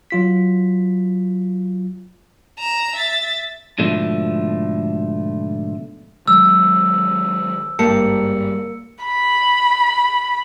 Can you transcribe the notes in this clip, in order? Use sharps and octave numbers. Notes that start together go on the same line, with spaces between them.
F#3 F4 B6
A#5 E7
E5 A6
G#2 B2 D3 F3 A3
D#3 F#3 G#3 E6
G#1 G2 G3 A#3 A5 C#7
B5